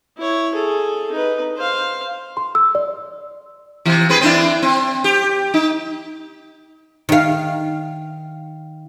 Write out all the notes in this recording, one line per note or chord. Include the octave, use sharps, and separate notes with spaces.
E4 C#5
G#4 A4
D#4 B4
C5 F5
C6
E6
D5
C3 E3
C4 G#4 B4
C4 D4 E4
C4
G4
D#4
D#3 F5